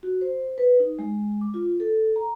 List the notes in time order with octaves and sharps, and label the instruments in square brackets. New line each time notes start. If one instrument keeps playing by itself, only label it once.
[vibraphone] F#4
C5
B4
D#4
G#3
D6
F4
A4
A#5